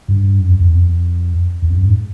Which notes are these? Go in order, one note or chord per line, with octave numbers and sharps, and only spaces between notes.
G2
F#2
F2
F2
E2
F2
E2
F2
F#2
G#2